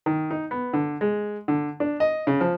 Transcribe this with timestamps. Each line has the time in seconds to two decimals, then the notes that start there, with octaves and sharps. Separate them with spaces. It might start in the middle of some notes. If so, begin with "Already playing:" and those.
0.06 D#3
0.31 D#4
0.51 B3
0.73 D3
1.01 G#3
1.48 D3
1.80 D4
2.00 D#5
2.27 C#3
2.41 F3